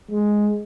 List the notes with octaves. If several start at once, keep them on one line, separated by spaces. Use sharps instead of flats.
G#3